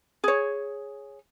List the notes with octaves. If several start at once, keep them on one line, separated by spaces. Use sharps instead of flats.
G#4 C#5